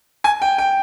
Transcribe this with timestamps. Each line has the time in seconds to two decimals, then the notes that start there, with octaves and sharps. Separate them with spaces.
0.24 G#5
0.42 G5
0.58 G5